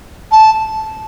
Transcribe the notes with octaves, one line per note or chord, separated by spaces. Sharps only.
A5